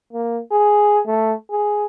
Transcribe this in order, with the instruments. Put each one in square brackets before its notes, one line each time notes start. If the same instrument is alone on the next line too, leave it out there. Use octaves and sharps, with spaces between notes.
[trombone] A#3
G#4
A3
G#4